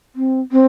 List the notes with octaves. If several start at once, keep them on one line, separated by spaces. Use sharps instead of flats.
C4
C4